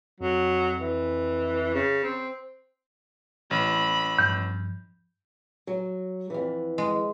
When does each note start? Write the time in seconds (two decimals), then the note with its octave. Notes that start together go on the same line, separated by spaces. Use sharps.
0.20 F2 F#3
0.80 E3
1.74 C#3
2.03 C4
3.51 A1 B5
4.19 G2 F3 G6
5.67 F#3
6.30 F2 E3
6.78 G#3